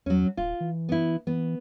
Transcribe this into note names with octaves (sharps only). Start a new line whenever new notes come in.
E2 F#3 C#4
D1 F4
E3
B3 E4
E3 B3